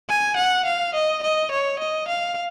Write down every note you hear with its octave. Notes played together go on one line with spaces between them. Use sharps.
G#5
F#5
F5
D#5
D#5
C#5
D#5
F5